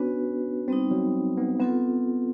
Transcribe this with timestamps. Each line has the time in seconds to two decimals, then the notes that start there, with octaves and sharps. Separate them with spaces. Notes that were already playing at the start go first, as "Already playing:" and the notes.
Already playing: B3 C#4 D4 F#4 B4
0.68 G3 B3 C4 D#4
0.91 F#3
1.37 B3
1.59 B3 C4 F4 A4